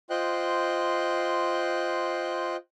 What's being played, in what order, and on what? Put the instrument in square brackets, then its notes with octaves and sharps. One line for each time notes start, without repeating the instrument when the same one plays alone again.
[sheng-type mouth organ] F4 C5 D#5 G5 C6 F#6